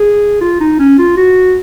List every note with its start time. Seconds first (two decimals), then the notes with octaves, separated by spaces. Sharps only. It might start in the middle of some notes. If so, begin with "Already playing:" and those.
Already playing: G#4
0.41 F4
0.60 D#4
0.79 C#4
0.98 F4
1.17 F#4